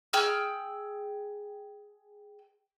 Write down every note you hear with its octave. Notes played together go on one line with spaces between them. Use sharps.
G#4 G5 E6 F6